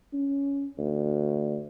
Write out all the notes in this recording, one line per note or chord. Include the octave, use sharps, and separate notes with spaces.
C#4
D2